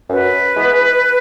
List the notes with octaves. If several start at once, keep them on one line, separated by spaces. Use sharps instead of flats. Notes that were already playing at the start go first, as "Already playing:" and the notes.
F#2 B4
E3 G#3 B3